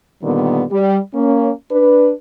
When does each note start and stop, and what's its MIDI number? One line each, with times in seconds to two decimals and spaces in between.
0.23 0.64 46
0.23 0.64 50
0.23 0.64 51
0.23 0.64 55
0.23 0.64 59
0.71 0.98 55
1.14 1.50 58
1.14 1.50 61
1.71 2.11 62
1.71 2.11 71